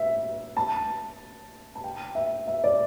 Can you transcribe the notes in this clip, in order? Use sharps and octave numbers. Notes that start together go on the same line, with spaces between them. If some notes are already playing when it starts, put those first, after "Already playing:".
Already playing: E5
A5
A5
G5
E5
E5
D5